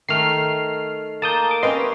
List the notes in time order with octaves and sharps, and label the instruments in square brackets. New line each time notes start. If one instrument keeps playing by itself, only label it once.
[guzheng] D#3 A3 [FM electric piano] F6 C7
[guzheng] A#3 [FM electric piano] A5 D#6 G6
[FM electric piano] D6
[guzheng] C4 C#4 G4 [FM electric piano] B4 D#5 C6